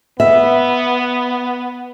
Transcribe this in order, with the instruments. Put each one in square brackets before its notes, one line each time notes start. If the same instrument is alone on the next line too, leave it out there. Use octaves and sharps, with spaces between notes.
[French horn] B3 [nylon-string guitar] E5